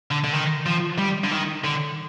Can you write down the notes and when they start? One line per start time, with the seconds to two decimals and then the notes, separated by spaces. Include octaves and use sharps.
0.11 D3
0.24 D3
0.33 D#3
0.66 F3
0.98 G3
1.24 D3
1.31 D#3
1.64 D3